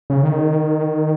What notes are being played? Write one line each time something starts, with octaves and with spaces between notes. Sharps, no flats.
C#3
D#3